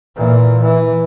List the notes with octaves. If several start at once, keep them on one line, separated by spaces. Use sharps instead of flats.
A#2 E3
E3